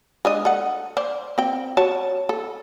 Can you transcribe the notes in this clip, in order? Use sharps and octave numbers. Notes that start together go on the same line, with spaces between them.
G#3 D4 D#5
A4 F#5
C5 D5
C4 G5
F#4 C#5 A5
A4